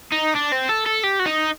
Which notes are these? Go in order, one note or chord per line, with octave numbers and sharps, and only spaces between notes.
D#4
D4
C4
A4
A4
G4
F#4
D#4